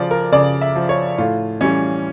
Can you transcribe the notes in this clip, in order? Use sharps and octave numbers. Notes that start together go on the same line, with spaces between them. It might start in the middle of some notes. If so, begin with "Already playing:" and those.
Already playing: C#3 F3 D5
A#4
C#3 D5
E5
F3
C#5
A2 F4
E3 G3 C#4